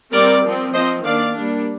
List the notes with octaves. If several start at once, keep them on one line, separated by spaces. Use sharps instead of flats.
G3 C4 A#4 D5
F3 C4
F3 C4 C5 D#5
D#3 A#3 D4 D5 F5
G3 A#3 D4